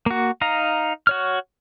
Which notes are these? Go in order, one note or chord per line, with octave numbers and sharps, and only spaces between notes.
A#3 F#4
D#4 F5 A#5
F#4 C#5 F6